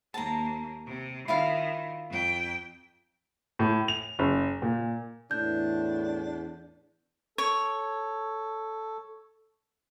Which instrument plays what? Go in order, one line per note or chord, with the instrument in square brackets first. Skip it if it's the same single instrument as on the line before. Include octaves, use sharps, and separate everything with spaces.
[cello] D#2 A#3 [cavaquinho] A5 A#5
[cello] C3
[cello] D#3 [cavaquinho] E4 F4 F5
[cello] F2 G5
[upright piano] A2
F7
F#1
A#2
[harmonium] E2 [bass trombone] A2 [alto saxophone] D4 [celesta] G6
[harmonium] A4 [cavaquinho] C#5